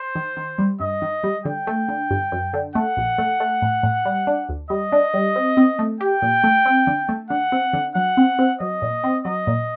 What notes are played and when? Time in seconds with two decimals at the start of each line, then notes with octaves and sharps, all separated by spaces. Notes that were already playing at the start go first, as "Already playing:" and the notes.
Already playing: C5
0.15 D#3
0.37 D#3
0.58 G3
0.80 G2 D#5
1.02 D#3
1.24 G3
1.45 D3 G5
1.67 A3
1.88 D3
2.10 G1
2.32 F#2
2.53 D3
2.75 A3 F#5
2.97 A#1
3.18 A3
3.40 A3
3.62 A2
3.83 A2
4.05 G3
4.27 D4
4.49 D2
4.70 G3 D#5
4.92 D4
5.14 G3
5.36 C4
5.57 C4
5.79 A3
6.00 G4 G5
6.22 A#2
6.44 A3
6.66 C4
6.87 D3
7.09 A3
7.30 D3 F#5
7.52 C4
7.73 D3
7.95 F#3 F#5
8.17 C4
8.39 C4
8.60 F#3 D#5
8.82 A#2
9.04 C4
9.25 F#3 D#5
9.47 A#2